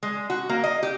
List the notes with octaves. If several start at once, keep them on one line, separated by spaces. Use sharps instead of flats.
G#3
F#4
A#3
D#5
G4